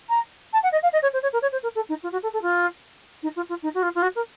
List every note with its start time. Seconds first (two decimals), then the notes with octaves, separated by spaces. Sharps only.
0.09 A#5
0.53 A5
0.63 F#5
0.72 D#5
0.83 F5
0.93 D#5
1.02 C#5
1.13 C5
1.23 C#5
1.33 A#4
1.42 C#5
1.52 C5
1.63 A#4
1.75 A4
1.89 D#4
2.03 F4
2.12 F#4
2.23 A4
2.33 A4
2.42 F4
3.23 D#4
3.36 F4
3.49 F4
3.62 D#4
3.74 F#4
3.82 F4
3.95 F4
4.02 F#4
4.15 A#4